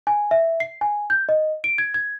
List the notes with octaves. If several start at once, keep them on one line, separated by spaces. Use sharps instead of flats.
G#5
E5
C7
G#5
G6
D#5
D7
G#6
G#6